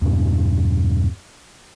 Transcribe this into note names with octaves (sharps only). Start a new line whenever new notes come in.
E2 G2 B2